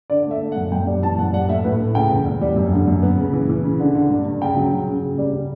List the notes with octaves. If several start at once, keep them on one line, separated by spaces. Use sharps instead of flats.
D3 D5
A3 E5
A3
F#5
F#2
F#2 G5
G3
E3 A5
F#2 F#5
G3 F#5
A2 E5
A2 B4
A2
C#3 G5
E2
E2
G3
F#2
D3
F#2
B3
C#3
E3
E3
C#3
D3
D3
G2
G2
C#3 G5
F#3
C#3
C#3
C#3
G3
C#3